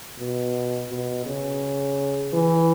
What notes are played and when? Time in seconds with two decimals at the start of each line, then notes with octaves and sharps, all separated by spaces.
0.19 B2
0.89 B2
1.26 C#3
2.33 E3